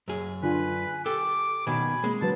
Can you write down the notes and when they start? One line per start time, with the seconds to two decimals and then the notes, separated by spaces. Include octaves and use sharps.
0.08 F#2 G#4
0.43 D3 D4 F4 B4 G#5
1.06 G4 A4 G5 D6
1.67 B2 D#3 G#5 B5
2.04 G#3 A#3 C4
2.22 D3 F#3 B4 A5